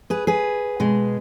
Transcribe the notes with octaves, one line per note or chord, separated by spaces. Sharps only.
G#4 B4
G#4 B4
B2 G#3